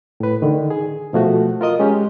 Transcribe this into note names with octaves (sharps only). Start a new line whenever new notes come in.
A2 B4
D3 D#3
G#4
B2 F3 A3 F#4
F4 A#4 D#5 D#6
G#3 C#4 G4